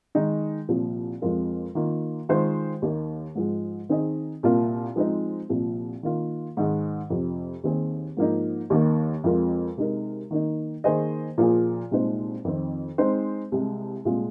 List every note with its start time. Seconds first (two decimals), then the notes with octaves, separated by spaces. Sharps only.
0.15 D#3 G#3 D#4
0.69 C2 A#2 F3
1.22 F2 F3 G#3 F4 A#4
1.75 D#3 A#3 F4
2.29 D#3 G#3 F4 C5
2.82 D#2 D#3 A#3
3.35 G#2 F3 G#3
3.89 D#3 C4 D#4 G#4 D#5
4.43 C2 A#2 A#3 F4
4.96 F3 G#3 C4 D#4 C5
5.49 C2 A#2 F3
6.03 D#3 A#3 F4
6.57 G#2 D#3 G#3
7.10 F2 C3 F3
7.64 D#2 D#3 C4 G#4
8.17 G#2 F3 A#3 D#4
8.70 D#2 D#3 A#3
9.24 F2 F3 G#3 F4 A#4
9.77 C3 G#3 D#4 A#4
10.31 D#3 A#3 D#4
10.84 D#3 A#3 G#4 C5 D#5
11.38 A#2 F3 A#3 F4 G#4
11.91 C2 A#2 G#3 D#4 C5
12.45 F2 D#3 C4
12.98 G#3 C4 D#4 C5
13.52 C2 C3 G#3
14.05 C2 A#2 G#3 F4 G#4